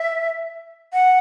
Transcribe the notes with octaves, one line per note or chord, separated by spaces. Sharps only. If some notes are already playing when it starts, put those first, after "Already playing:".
Already playing: E5
F#5